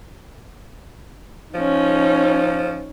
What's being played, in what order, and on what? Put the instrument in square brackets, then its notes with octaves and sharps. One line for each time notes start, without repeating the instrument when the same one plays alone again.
[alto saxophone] F3 [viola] C#4 D#4